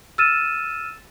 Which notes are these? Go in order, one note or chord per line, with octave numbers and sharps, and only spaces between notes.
E6 F6 A6 D#7 E7